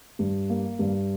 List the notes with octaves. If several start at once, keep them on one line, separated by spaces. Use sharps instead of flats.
G2
A#3
G2